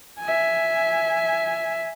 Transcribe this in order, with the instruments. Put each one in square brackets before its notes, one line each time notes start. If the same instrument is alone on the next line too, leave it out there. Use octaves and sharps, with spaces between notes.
[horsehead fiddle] E5 G#5